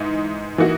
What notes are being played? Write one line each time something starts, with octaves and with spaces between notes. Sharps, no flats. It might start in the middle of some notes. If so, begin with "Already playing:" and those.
Already playing: G#2 E3 D#4
E3 A#3 D#4 F#4